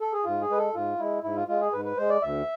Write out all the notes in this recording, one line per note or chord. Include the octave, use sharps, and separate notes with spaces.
A4
G#4
G#2 F4
G#4
G#3 B4
A4
G#2 F4
G#3 E4
G#2 E4
F4
G#3 F4
G#4
G#2 B4
B4
G#3 C5
D5
D2 E5